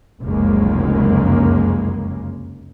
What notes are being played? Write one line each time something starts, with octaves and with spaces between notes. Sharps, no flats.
F1 C#2 F#2 C#3 G#3 A#3